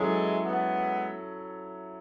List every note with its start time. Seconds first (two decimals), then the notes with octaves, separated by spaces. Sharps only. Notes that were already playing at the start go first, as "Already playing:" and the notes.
Already playing: E3 F#3 G#3 C#4 E4 A4
0.44 G#3 B3